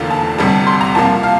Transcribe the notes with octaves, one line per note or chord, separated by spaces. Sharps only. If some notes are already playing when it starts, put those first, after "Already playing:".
Already playing: F1 E2 D3 F3 A#3
A5
G1 F2 C3 G3 A5
C6
A#5
C2 C3 F3 A#3 A5
F5